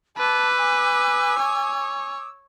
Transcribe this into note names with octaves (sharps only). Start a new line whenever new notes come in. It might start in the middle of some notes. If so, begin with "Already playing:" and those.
B4 A5 D6 E6
G#5
C#5